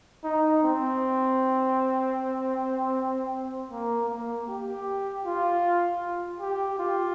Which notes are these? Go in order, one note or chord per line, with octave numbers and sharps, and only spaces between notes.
D#4
C4
A#3
A#3
G4
F4
G4
F4